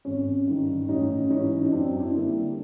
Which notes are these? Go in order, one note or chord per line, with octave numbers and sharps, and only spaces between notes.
G#1 C#4
G2 D#3
A1 C#4 D#4
G#2 E3 C#4 D#4
D#4
F#2 C4 D4
D4 E4
D3 G3 A#3